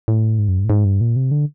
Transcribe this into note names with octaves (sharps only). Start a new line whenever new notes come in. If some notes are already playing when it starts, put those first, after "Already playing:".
A2
G#2
F#2
G2
A2
G#2
G2
A#2
C3
D3